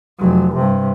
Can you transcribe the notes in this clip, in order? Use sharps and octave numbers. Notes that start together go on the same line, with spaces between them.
F1 F#3
G2 C3